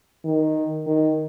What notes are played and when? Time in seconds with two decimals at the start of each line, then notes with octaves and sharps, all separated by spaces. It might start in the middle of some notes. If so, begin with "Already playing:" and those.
0.25 D#3
0.87 D#3